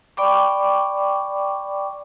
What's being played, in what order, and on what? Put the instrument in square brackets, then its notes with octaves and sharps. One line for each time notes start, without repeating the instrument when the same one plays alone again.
[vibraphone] D5 G5 B5 C#6 D6